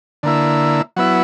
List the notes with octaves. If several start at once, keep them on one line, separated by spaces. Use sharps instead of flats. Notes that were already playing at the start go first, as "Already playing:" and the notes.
D3 A#3 E4
F#3 B3 E4